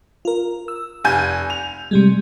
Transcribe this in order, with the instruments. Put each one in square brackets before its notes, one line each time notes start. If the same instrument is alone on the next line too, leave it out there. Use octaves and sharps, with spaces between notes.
[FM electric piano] F4 A#4
E6
[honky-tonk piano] F1 G#5 G6
F7
[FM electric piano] C3 G3 G#3